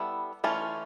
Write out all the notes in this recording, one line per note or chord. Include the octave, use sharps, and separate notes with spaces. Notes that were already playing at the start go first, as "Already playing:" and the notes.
Already playing: G3 B3 E4 A4
E3 A3 C#4 F4